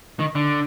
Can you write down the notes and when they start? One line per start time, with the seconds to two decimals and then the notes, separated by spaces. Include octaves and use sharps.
0.19 D#3
0.35 D3